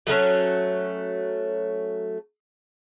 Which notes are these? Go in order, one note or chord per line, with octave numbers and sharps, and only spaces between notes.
F#3 A3 B3 C#4